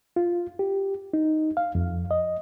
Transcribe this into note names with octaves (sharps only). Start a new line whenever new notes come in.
F4
G4
D#4
F5
F2
D#5